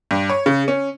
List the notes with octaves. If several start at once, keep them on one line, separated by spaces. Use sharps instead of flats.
G2
C#5
C#3
C#4